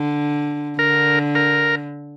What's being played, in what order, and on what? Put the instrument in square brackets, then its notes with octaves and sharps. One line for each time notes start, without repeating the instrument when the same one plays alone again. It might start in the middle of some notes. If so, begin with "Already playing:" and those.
Already playing: [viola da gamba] D3
[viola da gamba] D3 [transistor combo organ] A#4
[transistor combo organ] A#4